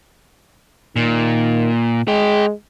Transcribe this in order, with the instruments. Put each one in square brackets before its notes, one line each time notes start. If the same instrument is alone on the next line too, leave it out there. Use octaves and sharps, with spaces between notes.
[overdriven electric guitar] A#2 [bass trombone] D#3
[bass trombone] G#3 [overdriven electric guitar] G#4 G5